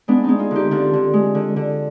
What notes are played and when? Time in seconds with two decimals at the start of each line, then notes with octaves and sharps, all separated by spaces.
0.08 G#3 B3 D4
0.24 G#3 C4 D#4
0.39 F4 G#4
0.51 D3 D#4 G4
0.71 D3 D4 F4
0.93 D3
1.13 G#3
1.35 D3
1.56 D3